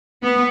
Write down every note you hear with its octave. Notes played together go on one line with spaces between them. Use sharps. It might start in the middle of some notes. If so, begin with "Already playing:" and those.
B3